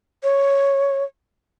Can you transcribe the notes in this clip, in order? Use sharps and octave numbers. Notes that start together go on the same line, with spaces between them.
C#5